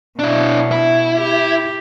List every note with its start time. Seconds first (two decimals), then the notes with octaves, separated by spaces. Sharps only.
0.19 B2 D4 E4
0.72 E4
1.17 G4